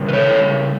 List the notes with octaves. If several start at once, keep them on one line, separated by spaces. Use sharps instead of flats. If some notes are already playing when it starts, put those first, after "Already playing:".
Already playing: C#3 G3
B4
A4 C#5